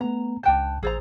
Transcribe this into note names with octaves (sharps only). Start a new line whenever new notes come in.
A3 B3 A#5
C#2 D4 G5 A5 F#6 G6
A1 G#4 C5 A#5 E6 A6